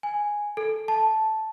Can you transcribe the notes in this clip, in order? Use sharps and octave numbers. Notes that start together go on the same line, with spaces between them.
G#5
A4
A5